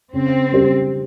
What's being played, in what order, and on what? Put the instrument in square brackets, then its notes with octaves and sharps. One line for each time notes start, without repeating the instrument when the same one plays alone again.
[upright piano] C#3 [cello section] C4
[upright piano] G3 C#4 G4 C5